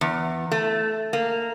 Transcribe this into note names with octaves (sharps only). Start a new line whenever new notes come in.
E2
A3
A#3